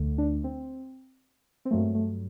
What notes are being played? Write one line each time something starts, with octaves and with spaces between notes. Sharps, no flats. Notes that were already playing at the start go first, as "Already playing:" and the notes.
Already playing: D2 D3 A3
D4
C4
C4
G2 F#3 A3 A#3
A3